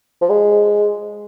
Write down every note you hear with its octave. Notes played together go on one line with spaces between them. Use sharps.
F3
G#3